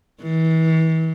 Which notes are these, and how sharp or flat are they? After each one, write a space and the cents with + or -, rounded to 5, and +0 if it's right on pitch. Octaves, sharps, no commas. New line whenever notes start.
E3 -35